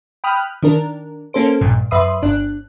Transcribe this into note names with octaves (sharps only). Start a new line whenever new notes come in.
G5 B5 D#6 F6 F#6
D#3 D4 A#4
A#3 C#4 A4 C5 D7
A#1 G2 A#2
F#2 B4 E5 C6 D#6
G1 D4 F#6